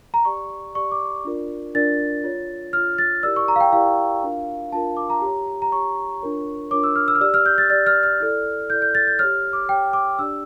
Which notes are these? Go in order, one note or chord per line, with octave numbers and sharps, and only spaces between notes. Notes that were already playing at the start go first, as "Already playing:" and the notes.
A#5
G4 D5 C#6
G4 D5 C#6
D6
D4 F4 A#4 D5
D4 F4 A#4 D5 A6
F4 C#5
F4 C#5 F6
A6
E4 G4 A#4 D5 E6
C#6
A#5
F5
G5
E4 G4 A#4 D5 F5
D4 F4 A#4
D4 F4 A#4 A5
D6
A#5
G4 C#5
A#5
G4 C#5 C#6
D4 F4 A#4 C#5
D4 F4 A#4 C#5 D6
E6
F6
E6
F6
G4 D5 E6
F6
G6
A6
G4 D5 A6
F6
F6
E4 A4 D5
E4 A4 D5 G6
G6
A6
G6
G4 C#5 F6
D6
G4 C#5 G5
D6
D4 G4 D5 E6